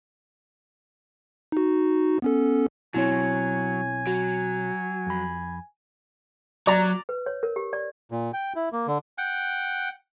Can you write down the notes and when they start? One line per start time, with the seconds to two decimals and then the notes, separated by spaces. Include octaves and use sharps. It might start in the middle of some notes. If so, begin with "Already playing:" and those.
1.52 D#4 F#4
2.22 B3 C#4 A4
2.94 B1 F#3 C4 E4 C#5 G#5
4.07 F#3 F#4
5.06 F2 B5
6.67 F#3 D5 A#5
7.09 B4
7.26 C#5
7.43 A#4
7.56 G4
7.73 D5
8.11 A#2
8.33 G5
8.56 E4
8.73 A#3
8.87 D3
9.18 F#5 G5